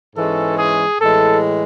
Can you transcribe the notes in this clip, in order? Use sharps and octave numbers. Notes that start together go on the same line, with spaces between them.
G#2 E3 G#3 C#4 A4
G#4
A2 E3 G#3 A4